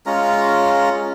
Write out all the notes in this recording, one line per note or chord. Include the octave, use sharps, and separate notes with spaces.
G#3 C#4 F4 A#5